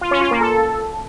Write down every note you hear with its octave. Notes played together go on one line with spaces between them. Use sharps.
F4
C#4
F4
A#3
A4